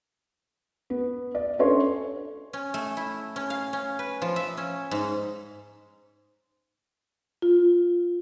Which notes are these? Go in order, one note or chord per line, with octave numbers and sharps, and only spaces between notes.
B3
D5
C#4 D4 A4 B4 C#5 C6
C#4
A3
E4
C#4
F5
C#4
B4
F3
E5
C#4
G#2
F4